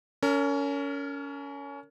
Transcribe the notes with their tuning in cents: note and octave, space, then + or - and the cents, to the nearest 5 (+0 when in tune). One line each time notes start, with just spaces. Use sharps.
C#4 +25 A#4 -25